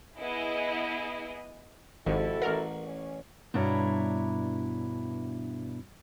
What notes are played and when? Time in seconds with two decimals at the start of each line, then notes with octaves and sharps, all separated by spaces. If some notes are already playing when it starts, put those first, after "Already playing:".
0.17 B3 E4 G#4 D#5
2.07 G#1 F2 C3 E4 F#4 A4
2.42 A1 A#4 F#5
2.84 C#4
3.54 G2 B2 D4 E4 C#5 A#5